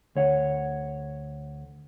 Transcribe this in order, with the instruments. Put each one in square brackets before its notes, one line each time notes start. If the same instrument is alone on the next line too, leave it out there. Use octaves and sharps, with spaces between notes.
[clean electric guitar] D2 C#5 F#5